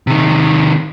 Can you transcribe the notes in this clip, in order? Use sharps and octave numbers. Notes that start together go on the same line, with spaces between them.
C3 D#3